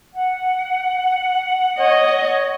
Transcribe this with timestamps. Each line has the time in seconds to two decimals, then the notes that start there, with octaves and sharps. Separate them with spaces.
0.14 F#5
1.79 C#5 D#5